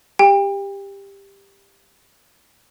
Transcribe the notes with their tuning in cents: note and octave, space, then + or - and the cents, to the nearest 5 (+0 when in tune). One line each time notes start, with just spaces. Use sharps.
G4 +15 G5 +35